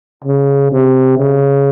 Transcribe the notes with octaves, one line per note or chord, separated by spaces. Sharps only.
C#3
C3
C#3